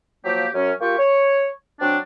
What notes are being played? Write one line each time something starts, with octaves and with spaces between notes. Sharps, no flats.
F3 F#3 A#3 G4
F#2 C#4
A#3 F4 G4 G5 C#6
C#5
F#3 C4 D4